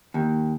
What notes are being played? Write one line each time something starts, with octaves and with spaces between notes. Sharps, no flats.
D#2